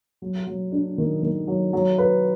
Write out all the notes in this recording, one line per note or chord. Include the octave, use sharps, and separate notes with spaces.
F#3
F#3
D4
D#3
D#3
F#3
F#3
B4